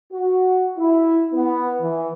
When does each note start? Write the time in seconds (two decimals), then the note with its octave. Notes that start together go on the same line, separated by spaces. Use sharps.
0.12 F#4
0.78 E4
1.34 B3
1.81 E3